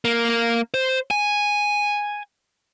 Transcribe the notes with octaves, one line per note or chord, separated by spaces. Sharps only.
A#3
C5
G#5